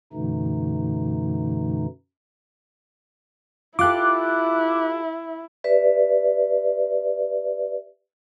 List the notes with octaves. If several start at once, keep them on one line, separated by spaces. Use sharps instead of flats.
F#2 B2 D3 E3 A3 D#4
E4 F4 G4 A4 D6 F#6
G4 B4 D5 E5